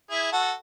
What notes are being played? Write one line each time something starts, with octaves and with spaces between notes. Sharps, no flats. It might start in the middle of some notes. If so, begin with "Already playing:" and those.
E4 G#4
F#4 A4